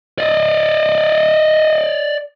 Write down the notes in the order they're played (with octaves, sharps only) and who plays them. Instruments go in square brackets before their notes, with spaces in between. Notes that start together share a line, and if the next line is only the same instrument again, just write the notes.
[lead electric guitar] D5 D#5